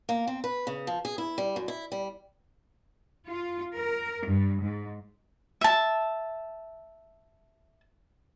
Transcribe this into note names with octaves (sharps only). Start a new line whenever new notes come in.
A#3
C4
B4
C#3
F3
G#4
E4
G3
F#2
E4
G3
F4
A#4
G2
G#2
E5 A5